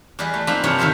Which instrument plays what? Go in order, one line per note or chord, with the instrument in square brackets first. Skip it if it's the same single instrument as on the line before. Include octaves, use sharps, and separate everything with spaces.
[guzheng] E2 G3 G#4 B4 D#5
A3
F2 A#3 C4 D#4 B5
E2 G2 C3 F4 C#5
D3 D#3 F3 C5 E5